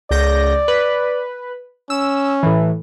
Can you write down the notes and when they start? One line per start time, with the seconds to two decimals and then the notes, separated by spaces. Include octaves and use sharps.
0.11 C#2 D5 G6 A#6
0.68 B4
1.90 C#4 E6
2.43 A2 E3